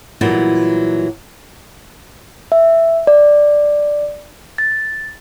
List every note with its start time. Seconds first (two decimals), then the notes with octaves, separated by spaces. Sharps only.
0.21 A#2 E3 F#3 G3 B3
2.52 E5
3.07 D5
4.58 A6